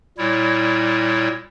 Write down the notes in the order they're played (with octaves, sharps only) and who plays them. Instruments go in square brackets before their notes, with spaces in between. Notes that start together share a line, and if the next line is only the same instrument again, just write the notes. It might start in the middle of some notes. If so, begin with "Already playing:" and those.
[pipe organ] A#2 G3 E4 C#5